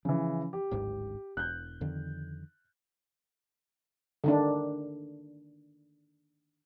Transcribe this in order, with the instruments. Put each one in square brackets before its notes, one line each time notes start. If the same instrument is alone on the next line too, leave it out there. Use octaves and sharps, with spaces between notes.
[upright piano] C#3 E3 [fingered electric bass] F3
[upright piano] G4
[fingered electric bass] D1 G#1 G#2
[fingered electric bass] E1 [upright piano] F#6 G6
[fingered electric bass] F2 D3 D#3
[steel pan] D3 D#3 D4